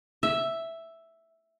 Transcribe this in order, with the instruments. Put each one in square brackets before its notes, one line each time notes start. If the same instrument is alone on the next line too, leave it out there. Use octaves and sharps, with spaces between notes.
[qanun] E5